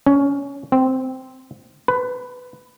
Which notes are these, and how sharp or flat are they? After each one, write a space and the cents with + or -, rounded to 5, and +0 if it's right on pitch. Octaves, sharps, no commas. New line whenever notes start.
C#4 +15
C4 -5
B4 +15